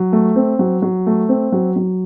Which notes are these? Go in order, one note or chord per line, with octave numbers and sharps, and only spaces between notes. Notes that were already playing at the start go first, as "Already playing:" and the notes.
Already playing: F#3
A3
C4
F#3
F#3
A3
C4
F#3
F#3